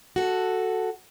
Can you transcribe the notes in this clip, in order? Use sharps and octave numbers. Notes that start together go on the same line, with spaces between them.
F#4 A4